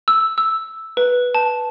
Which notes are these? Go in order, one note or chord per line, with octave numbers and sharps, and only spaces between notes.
E6
E6
B4
A5